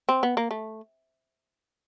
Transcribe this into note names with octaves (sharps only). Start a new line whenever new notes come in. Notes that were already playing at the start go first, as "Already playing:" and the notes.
C4
B3
A#3
A3